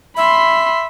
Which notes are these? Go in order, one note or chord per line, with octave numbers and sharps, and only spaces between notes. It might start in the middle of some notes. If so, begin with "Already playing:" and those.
E5 B5 C6